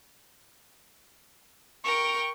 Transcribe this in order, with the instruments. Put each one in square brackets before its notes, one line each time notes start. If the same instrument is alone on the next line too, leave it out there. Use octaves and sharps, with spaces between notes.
[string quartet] A#4 G5 [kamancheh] C#6